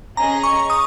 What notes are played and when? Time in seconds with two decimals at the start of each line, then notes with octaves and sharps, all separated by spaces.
0.17 C#4 G#4 D#5 A#5
0.43 C#6
0.70 D#6